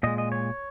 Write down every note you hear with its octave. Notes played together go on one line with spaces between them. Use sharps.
A#2 G#3 D#5
D#5
C#5